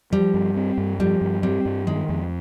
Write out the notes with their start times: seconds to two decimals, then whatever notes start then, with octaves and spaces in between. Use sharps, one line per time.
0.13 F3 G3
0.34 G2
0.56 C4
0.77 G2
0.99 F3 G3
1.21 G2
1.43 G3 C4
1.65 G2
1.87 D#3 G#3
2.09 F2